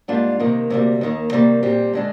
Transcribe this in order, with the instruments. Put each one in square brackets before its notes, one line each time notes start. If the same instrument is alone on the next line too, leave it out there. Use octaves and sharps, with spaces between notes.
[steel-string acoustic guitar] G#2 G3 A#3 D4 F4
C3 D#3 A#3
D2 C3 D#3 G3 A#3
D#2 D#3 A#3
C3 D#3 G3 A#3
A#2 G3 C4 G4
D3 G#3 D4